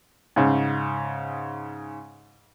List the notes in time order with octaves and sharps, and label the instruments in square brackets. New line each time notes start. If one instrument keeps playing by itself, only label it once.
[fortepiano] G#2 C#3